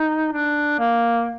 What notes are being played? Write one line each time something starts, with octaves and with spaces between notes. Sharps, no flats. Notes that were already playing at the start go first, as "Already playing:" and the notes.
Already playing: D#4
D4
A#3